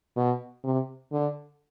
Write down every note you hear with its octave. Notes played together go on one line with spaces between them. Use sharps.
B2
C3
D3